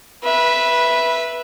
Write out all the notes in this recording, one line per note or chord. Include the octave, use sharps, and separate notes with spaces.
B4 E5